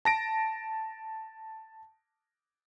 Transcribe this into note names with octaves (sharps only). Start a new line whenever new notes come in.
A5 A#6 D7